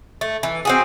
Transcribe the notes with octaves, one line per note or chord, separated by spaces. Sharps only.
A3
E3
C4 F#4 G#4